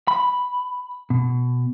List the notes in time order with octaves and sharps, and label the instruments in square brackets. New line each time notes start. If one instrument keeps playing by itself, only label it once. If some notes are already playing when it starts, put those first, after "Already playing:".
[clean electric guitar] B5
B2